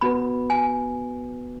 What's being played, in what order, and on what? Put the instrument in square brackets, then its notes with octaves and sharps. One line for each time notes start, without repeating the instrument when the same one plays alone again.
[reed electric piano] B3 F#4 B4 [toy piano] B5
[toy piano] G#5